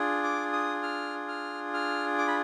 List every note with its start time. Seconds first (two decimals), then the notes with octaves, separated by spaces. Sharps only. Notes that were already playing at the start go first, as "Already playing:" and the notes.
Already playing: D4 F4 G#4
0.23 D6
0.53 D#6
0.83 F6
1.28 F6
1.74 F6
2.18 D6
2.27 B5